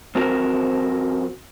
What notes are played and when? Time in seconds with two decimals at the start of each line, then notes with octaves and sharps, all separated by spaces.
0.15 F2 C4 F#4 A#4